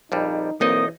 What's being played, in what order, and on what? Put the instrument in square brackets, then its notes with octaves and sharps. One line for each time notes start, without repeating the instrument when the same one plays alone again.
[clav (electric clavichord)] A#1 F2 G3 [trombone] D#4
[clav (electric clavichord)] B1 D#4 D#5 [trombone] E3 [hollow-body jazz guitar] A#3 C4 [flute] D#6